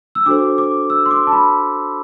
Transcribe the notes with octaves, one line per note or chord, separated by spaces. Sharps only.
E6
D4 F#4 A4 C5 D6
D6
E6
C6
D6
A5
B5